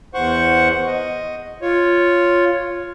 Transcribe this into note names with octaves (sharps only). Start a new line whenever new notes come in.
E2 C5 F#5 C#6
D#5
F4 C#5